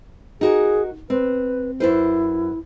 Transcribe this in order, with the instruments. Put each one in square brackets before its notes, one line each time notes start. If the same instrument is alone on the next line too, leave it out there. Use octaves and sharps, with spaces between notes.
[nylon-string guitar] D#4 F#4 A#4 [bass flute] G#4
[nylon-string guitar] C4 [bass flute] B4
[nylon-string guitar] F#2 B4 C5 [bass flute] E4